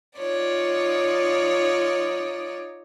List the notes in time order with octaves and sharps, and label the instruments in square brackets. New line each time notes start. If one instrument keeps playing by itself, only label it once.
[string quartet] D#4 F4 C#5 D5